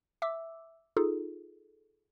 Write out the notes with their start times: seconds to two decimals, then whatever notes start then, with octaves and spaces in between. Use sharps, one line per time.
0.22 E5 D6 E6
0.97 D#4 F4 G#4 A4